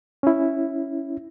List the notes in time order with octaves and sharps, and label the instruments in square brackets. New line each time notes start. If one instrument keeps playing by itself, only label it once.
[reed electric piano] C#4 E4